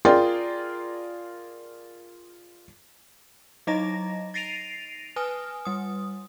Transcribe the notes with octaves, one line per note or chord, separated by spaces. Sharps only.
F4 G#4 A#4 D5 G5 C6
F#3 D#4 D#5 A#5 A#6
A6 A#6 C7 D7 D#7 F7
B4 G#5 D#6 F6
G3 D#6